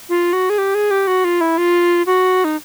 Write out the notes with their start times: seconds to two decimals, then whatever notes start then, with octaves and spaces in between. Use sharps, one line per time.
0.09 F4
0.33 F#4
0.50 G#4
0.58 G4
0.75 G#4
0.91 G4
1.07 F#4
1.24 F4
1.41 E4
1.58 F4
2.06 F#4
2.44 D#4